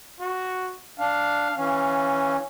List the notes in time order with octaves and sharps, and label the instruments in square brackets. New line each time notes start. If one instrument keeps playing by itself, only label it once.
[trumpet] F#4
[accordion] D4 [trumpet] F5
[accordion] E3 C#4 [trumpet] F5